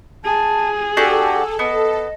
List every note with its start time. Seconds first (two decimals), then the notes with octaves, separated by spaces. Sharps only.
0.25 G#4 A5
0.97 D4 F#4 G4 A4 G#5
1.59 B3 D#5